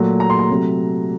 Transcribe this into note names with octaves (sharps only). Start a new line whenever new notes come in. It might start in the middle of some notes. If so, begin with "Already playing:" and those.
Already playing: A#2 F#3 A3
A#5
C6
A#5
C3 F#3 A3